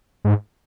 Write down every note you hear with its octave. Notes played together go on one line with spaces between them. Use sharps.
G#2